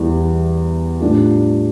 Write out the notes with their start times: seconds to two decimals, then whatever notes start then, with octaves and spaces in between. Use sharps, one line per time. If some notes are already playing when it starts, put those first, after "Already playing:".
Already playing: E2 E3 G3
1.00 A2 G3 D4 F4